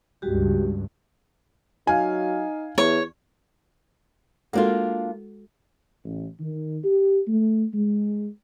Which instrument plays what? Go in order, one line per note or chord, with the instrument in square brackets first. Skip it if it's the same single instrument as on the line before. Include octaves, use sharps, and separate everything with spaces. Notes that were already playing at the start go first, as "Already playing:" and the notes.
[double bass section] C#2 G2 [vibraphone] G3 F#4 G4
[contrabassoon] F#3 [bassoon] D#4 [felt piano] F5 G#5
[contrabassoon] E2 [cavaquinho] C#5
[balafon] G#3 F#4 A4 [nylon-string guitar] A#3 D4 F4
[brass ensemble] A1
D#3
G4
A3
G#3